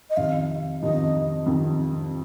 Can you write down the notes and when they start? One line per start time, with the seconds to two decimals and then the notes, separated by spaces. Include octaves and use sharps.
0.10 D#5
0.17 F2 C3 D#3 F5
0.82 F2 C3 D#3 D#5
1.46 F2 C3 D#3